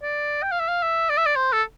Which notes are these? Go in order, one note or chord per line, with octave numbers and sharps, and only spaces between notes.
D5
G5
F5
E5
F5
E5
D5
E5
D5
C5
A4